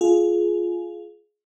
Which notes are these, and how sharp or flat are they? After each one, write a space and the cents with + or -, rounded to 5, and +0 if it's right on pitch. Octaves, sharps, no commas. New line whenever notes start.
F4 +0 G#4 +20